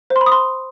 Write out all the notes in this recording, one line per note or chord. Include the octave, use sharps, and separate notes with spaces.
C5
C6
B5
D#6
C6